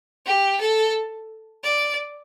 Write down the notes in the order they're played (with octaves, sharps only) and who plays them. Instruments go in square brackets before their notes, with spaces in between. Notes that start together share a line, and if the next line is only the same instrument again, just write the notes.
[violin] G4
A4
D5